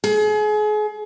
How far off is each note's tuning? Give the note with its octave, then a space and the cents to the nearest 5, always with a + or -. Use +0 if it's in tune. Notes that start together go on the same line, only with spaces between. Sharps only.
G#4 +35